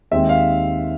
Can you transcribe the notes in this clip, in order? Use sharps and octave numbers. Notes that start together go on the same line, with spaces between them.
D#2 D#3 G#3 C4 E5
F5